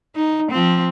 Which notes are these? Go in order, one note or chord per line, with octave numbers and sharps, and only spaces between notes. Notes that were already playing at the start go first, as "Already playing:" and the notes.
D#4
F3 C4